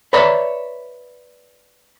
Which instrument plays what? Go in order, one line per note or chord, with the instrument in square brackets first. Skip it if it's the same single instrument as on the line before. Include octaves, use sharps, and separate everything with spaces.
[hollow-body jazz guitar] B4 C#5 D5 E5 A#5 B5